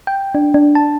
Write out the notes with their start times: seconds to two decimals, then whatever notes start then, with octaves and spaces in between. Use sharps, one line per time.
0.07 G5
0.35 D4
0.54 D4
0.75 A5